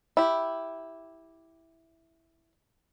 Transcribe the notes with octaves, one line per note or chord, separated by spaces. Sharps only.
E4 G4